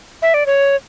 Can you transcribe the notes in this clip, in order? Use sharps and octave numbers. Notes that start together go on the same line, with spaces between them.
E5
D5
C#5